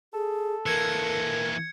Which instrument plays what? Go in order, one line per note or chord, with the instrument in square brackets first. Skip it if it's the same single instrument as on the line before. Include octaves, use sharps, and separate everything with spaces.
[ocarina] G#4 [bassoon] A4
[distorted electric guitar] E3 A#3 [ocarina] A#4 [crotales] G#6 C#7